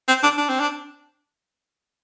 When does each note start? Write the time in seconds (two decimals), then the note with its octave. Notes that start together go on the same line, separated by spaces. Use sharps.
0.08 C4
0.23 D4
0.38 D4
0.49 C4
0.60 D4